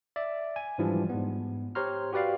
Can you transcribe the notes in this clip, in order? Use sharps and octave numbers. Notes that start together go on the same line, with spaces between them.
D5 E5
G#5
G#2 E3 F3 G3 D4
G#2 B3
G4 C5 C#5 A#5 C6 F6
F#4 G4 B4 D5 F5